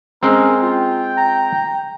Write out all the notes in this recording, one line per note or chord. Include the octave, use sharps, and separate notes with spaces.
G#3 C4 C#4 A#4
F4 G5
A#5